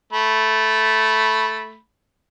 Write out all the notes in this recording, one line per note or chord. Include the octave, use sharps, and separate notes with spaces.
A3 B5